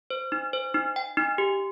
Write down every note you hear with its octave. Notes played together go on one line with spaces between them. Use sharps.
C5
D#4
C5
D#4
G5
D#4
G4